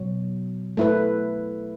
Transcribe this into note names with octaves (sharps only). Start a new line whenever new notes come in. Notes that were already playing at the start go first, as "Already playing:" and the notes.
Already playing: B2 F#3
A3 E4 B4